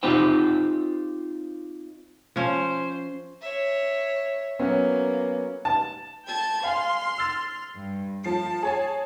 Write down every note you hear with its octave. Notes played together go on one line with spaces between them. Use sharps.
C4 D#4 F4 G4 C5 G5
F3 C#4 C5
C#5 E5
F#3 A#3 B3 C#4
A5
G5 A5 G#6
F5 G#5 C6 F6
E6 A6
G2
F3 A5 C7
G#4 C#5 G#5